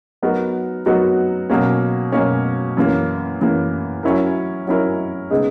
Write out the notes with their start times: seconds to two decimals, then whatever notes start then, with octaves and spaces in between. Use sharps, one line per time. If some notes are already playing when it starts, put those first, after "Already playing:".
0.22 F#3 B3 D#4 F#4 A#4
0.86 F#3 B3 D#4 F#4 A#4
1.50 B2 F#3 A#3 C#4
2.12 B2 F#3 A#3 C#4
2.77 F#2 E3 A#3
3.40 F#2 E3 A#3
4.03 F#3 C#4 E4 A#4
4.67 F#3 C#4 E4 A#4
5.30 C#3 G#3 B3 D#4